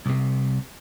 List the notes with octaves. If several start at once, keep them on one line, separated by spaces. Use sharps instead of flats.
C2 C3